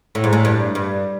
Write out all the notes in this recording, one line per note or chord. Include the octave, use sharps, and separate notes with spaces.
A2
G#2
A2
G2
G2